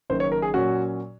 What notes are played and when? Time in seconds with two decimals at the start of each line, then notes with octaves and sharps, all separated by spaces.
0.10 F#1 F#2 D#3 C5
0.20 C#5
0.32 A#4
0.42 G#4
0.54 A#2 F#3 C#4 F#4